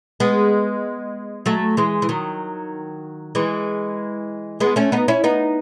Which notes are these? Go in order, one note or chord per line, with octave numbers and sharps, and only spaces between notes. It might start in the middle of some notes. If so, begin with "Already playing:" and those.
G#3 B3
F#3 A3
E3 G#3
E3
D#3 F#3
E3 G#3
G#3 B3
A3 C#4
B3 D#4
C#4 E4
B3 D#4